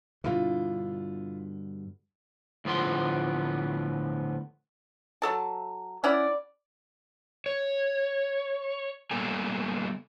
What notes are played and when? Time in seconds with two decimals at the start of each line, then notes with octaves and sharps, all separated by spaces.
0.24 G2 B2 D3 E4 F4
2.65 D2 A2 F3 B3 C6
5.22 F#3 A4 A5
6.04 C#4 E4 D5 F#5
7.46 C#5
9.11 G3 A#3 B3 A4 G#5 A#5